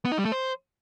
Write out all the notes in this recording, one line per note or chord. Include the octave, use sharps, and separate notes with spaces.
B3
D#4
G3
A3
C5